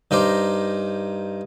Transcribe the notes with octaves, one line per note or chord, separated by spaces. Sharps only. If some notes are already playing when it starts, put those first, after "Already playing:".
G2 D#4 A#4 C5 D6